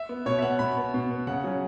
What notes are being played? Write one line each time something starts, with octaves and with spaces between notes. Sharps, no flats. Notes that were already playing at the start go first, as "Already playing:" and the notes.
Already playing: E5
B3
B2 C#5
E5
B3 F#5
B2 B5
B3
B2
B3
C#3 F#5
F#3 C#4